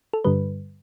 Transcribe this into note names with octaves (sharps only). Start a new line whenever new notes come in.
A4
G2 D3 G3 B4